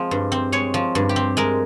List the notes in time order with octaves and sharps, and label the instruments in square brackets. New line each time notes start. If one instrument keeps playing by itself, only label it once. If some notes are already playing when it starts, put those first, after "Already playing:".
Already playing: [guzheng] F3 G#3 C4
G2
C4
G#3 C#5
F3
G2
G4
C4
G#3 A#4